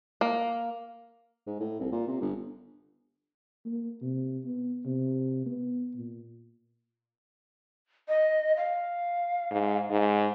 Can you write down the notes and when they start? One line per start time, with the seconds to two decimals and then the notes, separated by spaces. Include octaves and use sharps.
0.21 A#3
1.47 G#2
1.60 A2
1.80 C2
1.92 A#2
2.08 C3
2.21 G1
3.66 A#3
4.02 C3
4.46 B3
4.86 C3
5.46 B3
5.96 A#2
8.08 D#5
8.57 F5
9.51 G#2
9.91 G#2